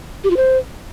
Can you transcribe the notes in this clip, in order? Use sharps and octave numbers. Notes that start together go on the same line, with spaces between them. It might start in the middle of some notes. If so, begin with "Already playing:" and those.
G4
F4
C5